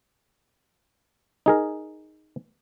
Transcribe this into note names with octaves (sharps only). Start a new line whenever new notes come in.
D#4 G#4 A#4